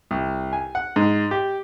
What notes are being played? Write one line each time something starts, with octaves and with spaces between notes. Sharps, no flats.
C2
G#5
F#5
G#2
G4